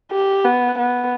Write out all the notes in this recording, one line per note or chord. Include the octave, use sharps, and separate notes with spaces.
G4
B3
B3